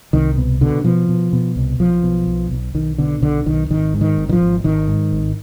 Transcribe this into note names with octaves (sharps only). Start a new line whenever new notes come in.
C2 D#3
B2
B2 D3
B2 F3
B2
B2
C2
B1 F3
B2
B1
B1
B1 D#3
B2 D3
B1 D3
B1 D#3
G#1 D#3
G#2
D#3
G#1
D#3
F3
G#1
G#1 D#3
G#2
G#1